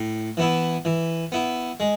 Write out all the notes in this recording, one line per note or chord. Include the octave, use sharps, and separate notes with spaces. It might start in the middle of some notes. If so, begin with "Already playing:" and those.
Already playing: A2
E3 B3 E4
E3
B3 E4
G#3